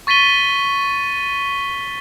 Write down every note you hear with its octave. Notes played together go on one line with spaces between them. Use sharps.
C#6 A6 B6 D#7 G7